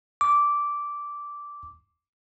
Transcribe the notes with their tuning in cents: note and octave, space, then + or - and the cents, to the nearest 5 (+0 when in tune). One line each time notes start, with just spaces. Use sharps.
D6 -10